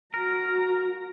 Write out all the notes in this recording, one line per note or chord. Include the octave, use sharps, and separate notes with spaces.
F#4 A#4 A#5